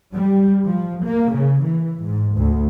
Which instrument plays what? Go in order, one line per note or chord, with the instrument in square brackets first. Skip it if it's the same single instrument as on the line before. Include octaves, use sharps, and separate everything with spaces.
[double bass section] G3
F3
A#3
C#3
E3
G#2
D2